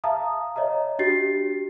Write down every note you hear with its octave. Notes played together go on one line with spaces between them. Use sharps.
E5 F5 A5 A#5 D#6
C#5 D#5 E5 A#5
D4 F#4 G4 A6 C7